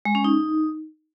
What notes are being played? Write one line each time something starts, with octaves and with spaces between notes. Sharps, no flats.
G#3
C#4
D#4